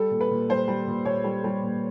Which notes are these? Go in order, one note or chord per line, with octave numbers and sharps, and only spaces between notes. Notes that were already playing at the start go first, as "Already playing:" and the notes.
Already playing: G3 A4
A#2
B4
A#2
G3 C5
G3
A#2
A#2 C#5
G3
G3
A#2